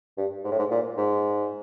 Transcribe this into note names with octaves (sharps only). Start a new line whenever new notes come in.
G2
G#2
A2
G#2
A#2
G#2